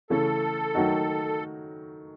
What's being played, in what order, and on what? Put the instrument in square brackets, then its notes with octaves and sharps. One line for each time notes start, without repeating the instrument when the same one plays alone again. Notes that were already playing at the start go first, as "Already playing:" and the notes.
[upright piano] C#3 E3 A3 C#4 [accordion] A4
[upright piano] D#3 F#3 A3 D#4 F#4